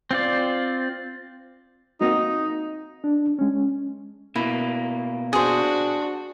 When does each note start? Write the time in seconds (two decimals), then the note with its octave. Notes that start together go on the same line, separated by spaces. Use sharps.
0.11 C4 F4 D5
2.01 A#3 C4 D#4 F#4
3.04 D4
3.39 G#3 C#4
4.36 B2 A#3 E4
5.33 D4 F#4 G#4 C5